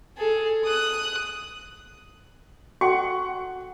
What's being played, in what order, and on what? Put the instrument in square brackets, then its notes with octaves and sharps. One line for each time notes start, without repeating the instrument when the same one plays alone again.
[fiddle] G#4 A4
D#6 F#6
[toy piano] F#4 A4 G5 [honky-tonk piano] F#5 C#6